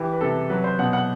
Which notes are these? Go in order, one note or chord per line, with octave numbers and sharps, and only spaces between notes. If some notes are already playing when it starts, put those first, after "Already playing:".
Already playing: E3 G4
B4
C3 A4
F#3 B4
C5
B2 F#5
F#5